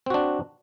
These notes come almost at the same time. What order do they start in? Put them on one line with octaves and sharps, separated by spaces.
C4 F#4 D4